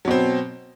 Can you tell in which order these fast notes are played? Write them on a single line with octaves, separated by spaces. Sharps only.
F#3 B2 C4